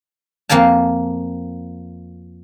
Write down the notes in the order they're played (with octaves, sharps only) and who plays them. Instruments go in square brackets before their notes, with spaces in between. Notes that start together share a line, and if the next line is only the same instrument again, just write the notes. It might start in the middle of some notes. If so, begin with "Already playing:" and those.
[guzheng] F2 A#3 F5 G#5 A5